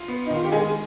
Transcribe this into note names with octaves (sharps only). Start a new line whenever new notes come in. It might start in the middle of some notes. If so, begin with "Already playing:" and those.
Already playing: F4
B3
D#4
D#3 F4
G4
D#3 G#3 G#4